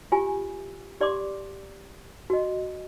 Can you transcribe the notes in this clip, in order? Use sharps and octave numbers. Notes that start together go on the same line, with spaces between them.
F4 G4 G#5
G4 D5 C6 D6
F#4 D#5